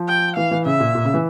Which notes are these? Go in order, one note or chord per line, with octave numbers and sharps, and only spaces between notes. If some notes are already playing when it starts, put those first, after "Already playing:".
Already playing: F3
G5
E3 F5
E3
C#3 E5
A#2
A#2
C#3
E3